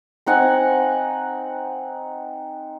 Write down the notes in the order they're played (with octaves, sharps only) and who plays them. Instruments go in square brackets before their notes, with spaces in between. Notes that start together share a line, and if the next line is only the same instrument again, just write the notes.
[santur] C4 D#4 F#5 G#5